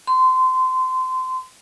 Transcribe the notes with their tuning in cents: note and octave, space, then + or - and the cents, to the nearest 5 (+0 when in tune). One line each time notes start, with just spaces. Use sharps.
C6 -25